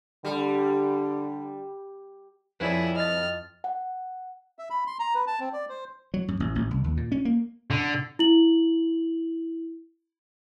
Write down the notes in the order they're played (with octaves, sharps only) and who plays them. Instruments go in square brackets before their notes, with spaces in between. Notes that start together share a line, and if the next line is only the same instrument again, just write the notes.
[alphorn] D3 [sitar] G3
[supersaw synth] F2 [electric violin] E4 G#4 [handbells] B4 C#5 D5
[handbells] D#5 A6 [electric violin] F6
[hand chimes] F#5
[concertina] E5
B5
C6
A#5
B4
A5
C4
D5
C5
[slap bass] F#3
F#2
A1
A1
C2
D#2
A#2
C#4
A#3
[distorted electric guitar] D3
[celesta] E4 F#7